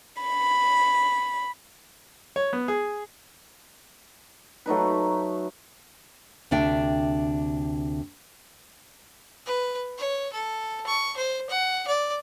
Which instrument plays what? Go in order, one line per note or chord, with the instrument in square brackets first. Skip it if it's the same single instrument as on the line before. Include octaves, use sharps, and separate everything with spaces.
[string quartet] B5
[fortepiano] C#5
B3
G#4
[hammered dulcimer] F#3 A3 D#4 B4
[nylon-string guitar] D2 C3 D4 E5 G5
[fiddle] B4
C#5
A4
C#6
C5
F#5
D5